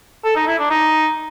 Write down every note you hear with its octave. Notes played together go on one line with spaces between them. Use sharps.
A4
D#4
E4
D4
D#4